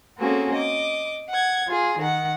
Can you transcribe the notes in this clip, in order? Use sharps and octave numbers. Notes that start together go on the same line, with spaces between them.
A#3 C4 C#4 F#4 G#4 A4
D#5 D6
F#5 G#6
F4 G#4
D#3 F#5